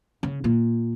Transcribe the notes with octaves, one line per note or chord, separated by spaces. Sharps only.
C#3
A#2